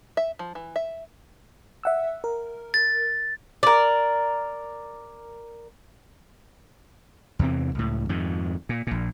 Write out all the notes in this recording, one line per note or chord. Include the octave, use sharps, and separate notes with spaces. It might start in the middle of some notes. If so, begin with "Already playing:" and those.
E5
F3
E3
E5
E5 F#5 E6
A#4
A6
A#4 D5
E2 C3 E3 C4
C#2 A2
F2 G#2 D#3
A#2
A#1 A#2